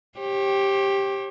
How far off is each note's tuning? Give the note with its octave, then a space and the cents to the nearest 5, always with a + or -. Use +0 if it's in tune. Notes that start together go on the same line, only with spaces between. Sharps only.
G4 +0 C#5 -45